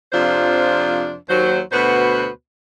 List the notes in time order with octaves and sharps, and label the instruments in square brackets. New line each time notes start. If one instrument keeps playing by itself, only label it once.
[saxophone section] F2 C3 F3 D4 F4 C5
D#2 F#3 C5
D2 B2 B3 F#4 B4 C5